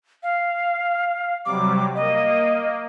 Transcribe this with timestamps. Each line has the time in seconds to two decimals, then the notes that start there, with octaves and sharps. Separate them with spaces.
0.23 F5
1.46 C3 F#3 G3 D6
1.95 A#3 D#5